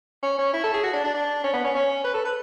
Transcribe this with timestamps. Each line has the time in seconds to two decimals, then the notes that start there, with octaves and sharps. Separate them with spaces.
0.23 C#4
0.39 C#4
0.54 E4
0.64 A4
0.74 G#4
0.83 F#4
0.93 D4
1.04 D4
1.14 D4
1.44 C#4
1.53 B3
1.64 C#4
1.75 C#4
2.04 B4
2.14 A4
2.25 B4